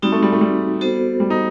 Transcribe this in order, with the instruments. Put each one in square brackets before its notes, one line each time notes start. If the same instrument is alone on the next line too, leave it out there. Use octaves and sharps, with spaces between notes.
[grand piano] G3 [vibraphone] C4 D#4 F#4
[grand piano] A3
G3
A3
G3
[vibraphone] B3 F#4 A4 C5
[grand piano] G3
D#4